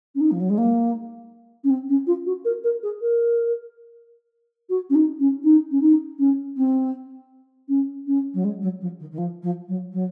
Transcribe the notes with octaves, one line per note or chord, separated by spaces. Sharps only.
C#4
D#4
F3
F#3
G#3
A#3
C#4
C4
C#4
F4
F#4
A#4
A#4
G#4
A#4
F#4
C#4
D#4
C#4
D#4
C#4
D#4
C#4
C4
C#4
C#4
F#3
G#3
F#3
F3
D#3
D#3
F3
F3
F#3
F#3